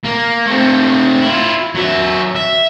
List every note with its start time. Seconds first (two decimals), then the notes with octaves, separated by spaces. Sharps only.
0.04 A#3
0.47 A3 C4
1.21 E4 F4
1.75 F#3 E5
2.36 E5